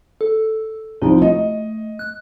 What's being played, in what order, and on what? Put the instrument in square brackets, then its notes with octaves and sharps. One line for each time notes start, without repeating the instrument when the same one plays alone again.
[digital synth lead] A4
[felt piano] C2 F3 [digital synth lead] D#4
[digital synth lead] A3 [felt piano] D#5
[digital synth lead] F#6